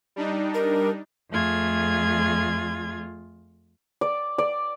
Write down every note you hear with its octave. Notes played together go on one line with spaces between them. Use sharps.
G3 D4 D#4
A#4
F2 A3 F4 G#4 G#6
D5
D5